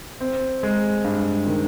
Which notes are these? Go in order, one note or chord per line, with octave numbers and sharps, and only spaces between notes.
C4
G#3
G2
D#3